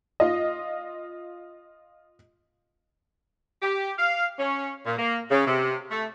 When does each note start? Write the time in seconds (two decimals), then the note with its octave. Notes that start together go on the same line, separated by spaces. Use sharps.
0.20 F4 D#5
3.62 G4
3.98 F5
4.39 C#4
4.86 A#2
4.98 A#3
5.31 C#3
5.47 C3
5.91 A3